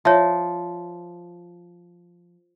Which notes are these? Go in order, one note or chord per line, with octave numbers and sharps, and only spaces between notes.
F3 C#5 E5